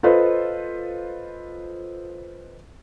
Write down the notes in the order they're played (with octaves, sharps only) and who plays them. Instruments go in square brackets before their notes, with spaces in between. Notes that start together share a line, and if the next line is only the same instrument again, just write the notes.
[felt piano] F4 A4 B4 C5 D#5